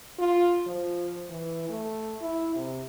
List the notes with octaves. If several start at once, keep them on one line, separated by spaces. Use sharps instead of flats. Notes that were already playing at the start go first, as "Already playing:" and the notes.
F4
F3
E3
A3
E4
C3